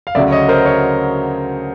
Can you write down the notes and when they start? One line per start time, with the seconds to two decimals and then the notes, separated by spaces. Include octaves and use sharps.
0.07 F5
0.15 D2 C#3 F#3 D5 E5
0.31 C#5 D#5
0.48 A#4 C5
0.65 C#5